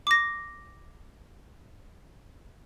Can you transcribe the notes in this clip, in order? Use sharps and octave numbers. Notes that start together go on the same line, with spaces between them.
D6 A#6